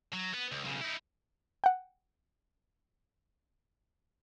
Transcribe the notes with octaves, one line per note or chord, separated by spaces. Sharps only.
F#3
B3
C#2
B1 C#3
D#4 E4
F#5 G5